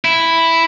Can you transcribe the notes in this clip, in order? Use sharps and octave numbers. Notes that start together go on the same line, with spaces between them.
E4